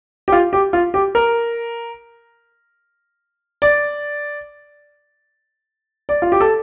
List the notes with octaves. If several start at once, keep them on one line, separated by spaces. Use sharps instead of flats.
G4
F4
G4
F4
G4
A#4
D5
D5
F4
G4
A4